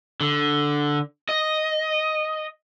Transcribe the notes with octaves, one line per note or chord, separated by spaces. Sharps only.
D3
D#5